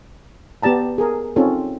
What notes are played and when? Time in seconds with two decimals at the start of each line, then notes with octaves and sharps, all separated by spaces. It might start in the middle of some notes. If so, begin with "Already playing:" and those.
0.63 B3 G4 D5 A5 A#5
0.98 G#4 A#4
1.36 C4 C#4 D#4 F4 A4